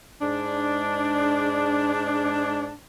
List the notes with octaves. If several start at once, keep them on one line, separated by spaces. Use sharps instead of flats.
G#2 G#3 D4